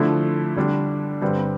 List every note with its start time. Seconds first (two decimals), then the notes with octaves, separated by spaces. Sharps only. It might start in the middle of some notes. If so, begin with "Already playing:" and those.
Already playing: D3 F3 A3 E4
0.56 D3 G3 D4
1.22 G2 D3 G3 C4